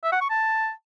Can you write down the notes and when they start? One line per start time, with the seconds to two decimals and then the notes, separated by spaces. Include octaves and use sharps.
0.03 E5
0.12 F#5
0.21 C#6
0.30 A5